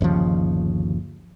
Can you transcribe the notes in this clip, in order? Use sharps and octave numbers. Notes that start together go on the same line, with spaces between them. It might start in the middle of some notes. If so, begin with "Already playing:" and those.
G1 D#2 C#3 F3